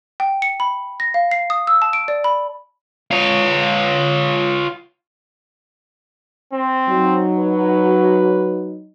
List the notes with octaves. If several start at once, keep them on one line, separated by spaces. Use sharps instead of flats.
G5
C#7
B5
A#6
F5
C7
D#6
E6
A5
D7
D5
B5
F4 C#5
C4
F#3 D#4
B4